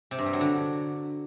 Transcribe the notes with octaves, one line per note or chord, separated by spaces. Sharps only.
C3
G2
G3
F#3
D3